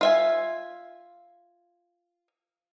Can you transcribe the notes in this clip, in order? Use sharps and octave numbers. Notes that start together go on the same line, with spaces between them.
F4 E5 G#5